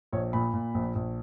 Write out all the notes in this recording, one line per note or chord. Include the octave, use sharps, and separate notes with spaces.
A#1 C#5
A#2 B5
A#2
A#1
A#1